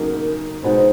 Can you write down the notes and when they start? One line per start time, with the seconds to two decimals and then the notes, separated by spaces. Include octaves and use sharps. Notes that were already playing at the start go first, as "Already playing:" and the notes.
Already playing: C#3 F#3 A#3 D#4 A#4
0.64 B2 G#3 B3 D#4 C5